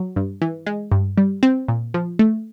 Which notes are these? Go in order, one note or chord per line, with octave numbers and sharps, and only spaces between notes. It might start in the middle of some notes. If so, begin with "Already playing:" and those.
Already playing: F#3
G2
E3
G#3
G2
G3
C4
A#2
F3
A3